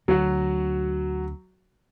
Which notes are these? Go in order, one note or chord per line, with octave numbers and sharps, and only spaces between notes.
D2 D3 F#3 F#4